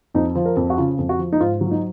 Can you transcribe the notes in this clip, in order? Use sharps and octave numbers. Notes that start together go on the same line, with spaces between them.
F2 D#4
F3
A#4
F2
F#4
C#3 F4
F2
F#4
F3
D#4
G#2 F4
F#3 F4
D#4